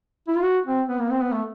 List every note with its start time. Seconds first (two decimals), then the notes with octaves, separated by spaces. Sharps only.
0.28 E4
0.36 F4
0.43 F#4
0.66 C4
0.89 B3
1.00 A#3
1.11 C4
1.22 B3
1.32 A3